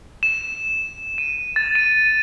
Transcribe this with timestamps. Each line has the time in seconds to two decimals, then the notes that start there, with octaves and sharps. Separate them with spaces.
0.23 E7
1.18 D#7
1.56 A6
1.75 D#7